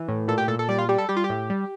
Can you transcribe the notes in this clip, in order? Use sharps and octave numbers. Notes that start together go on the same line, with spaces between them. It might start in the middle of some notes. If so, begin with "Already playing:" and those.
Already playing: E3
A2
A#2 A4
G4
A#2 A4
A4
G3 D5
F4
G3 G4
A4
G3 G4
F4
G4
A2
G3